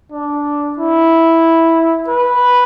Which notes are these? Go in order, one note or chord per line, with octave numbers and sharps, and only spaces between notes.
D4
E4
B4